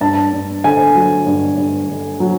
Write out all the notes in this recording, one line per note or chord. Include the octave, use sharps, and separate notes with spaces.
G2 A5
G2
D3 G#5
F#3
G2
G2
D3
F#3